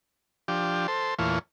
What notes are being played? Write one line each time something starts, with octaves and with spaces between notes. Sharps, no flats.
F3 D4 G4
A4 C5
E2 A#2 E3 A3 F4 C#5